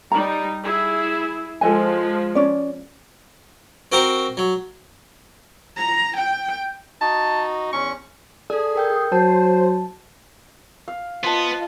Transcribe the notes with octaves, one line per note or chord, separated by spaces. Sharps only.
G3 D#4 A#5
E4 G#4
F3 G#3 A4 D#5 G#5
C#4 D5
C4 F#4 A#4 C5
F#3
A#5
G5
D#4 F#4 D#5 A5
E2 C#4 C#6
G#4 A4 D5
A#4 G5 G6
F#3 C5 A5
F5
B3 F4 C5 D#5 A5